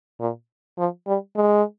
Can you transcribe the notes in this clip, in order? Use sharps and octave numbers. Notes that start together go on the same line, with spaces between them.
A#2
F3
G3
G#3